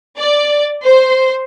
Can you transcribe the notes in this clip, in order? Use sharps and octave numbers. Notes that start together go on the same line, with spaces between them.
D5
C5